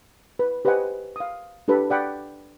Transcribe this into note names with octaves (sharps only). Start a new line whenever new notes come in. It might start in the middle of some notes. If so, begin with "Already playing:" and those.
B4
G4 B4 C5 D#5 F#5 G#5
F5 D#6
D4 G4 A4 B4 B5
D5 F#5 G5 B5